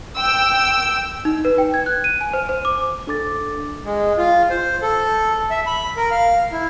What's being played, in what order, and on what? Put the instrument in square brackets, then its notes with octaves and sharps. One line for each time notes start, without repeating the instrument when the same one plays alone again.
[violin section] G5 E6
[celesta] D#4
B4
G5
G#6
F#6
D#7
G#5
C5
C5
D6
[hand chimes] D4 A4 D6 A6
[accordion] G#3
F4
C5
A4
E5
B5
A#4
F5
E4